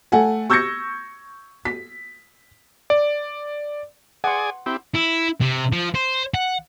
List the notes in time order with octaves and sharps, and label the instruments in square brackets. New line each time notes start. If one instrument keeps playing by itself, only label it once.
[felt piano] A3 F#5 G#5
C#6 E6 G6 G#6 A#6 C#7
B6
[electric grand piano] D5
[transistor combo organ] G#4 D5 G#5 [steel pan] F#5 C6
[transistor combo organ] C4 E4 G4
[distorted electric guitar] E4
C3
F3
C5
F#5